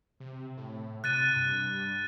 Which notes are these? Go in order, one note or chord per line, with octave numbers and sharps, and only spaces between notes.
C3
A2
C3 F#6 A6 D#7
G2